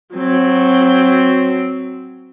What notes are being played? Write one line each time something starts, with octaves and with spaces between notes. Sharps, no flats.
F#3 C4